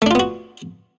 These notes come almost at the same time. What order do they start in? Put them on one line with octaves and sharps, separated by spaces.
A3 D4 F4 B3 F#4